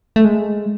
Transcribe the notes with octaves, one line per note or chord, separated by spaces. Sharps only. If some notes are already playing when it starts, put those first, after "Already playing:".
A3
G#3